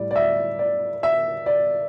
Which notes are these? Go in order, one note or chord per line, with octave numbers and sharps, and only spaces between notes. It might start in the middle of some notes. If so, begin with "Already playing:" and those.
Already playing: A2 G3 D5
D5
E5
D5
E5
D5